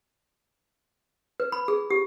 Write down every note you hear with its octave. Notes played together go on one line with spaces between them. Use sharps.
B4
B5
G#4
G4